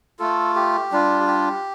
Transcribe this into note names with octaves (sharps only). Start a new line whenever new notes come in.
A3 F4 A4
G4
G3 D4 F4
G4